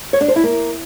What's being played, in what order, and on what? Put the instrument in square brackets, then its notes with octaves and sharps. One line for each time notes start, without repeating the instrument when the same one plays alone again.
[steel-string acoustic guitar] C#5
D4
C5
E4
A#3